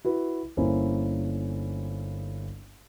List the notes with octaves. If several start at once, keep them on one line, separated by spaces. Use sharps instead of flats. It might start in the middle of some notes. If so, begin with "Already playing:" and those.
E4 F#4 B4
G1 A#3 C#4 E4 C5